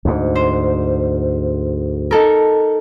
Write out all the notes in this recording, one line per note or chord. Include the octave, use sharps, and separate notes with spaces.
D2 G#2
C5
D#4 A4 A#4